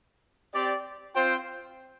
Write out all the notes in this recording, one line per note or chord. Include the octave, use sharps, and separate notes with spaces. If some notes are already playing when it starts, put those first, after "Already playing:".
C4 G4 D5
C4 F4 C5 G5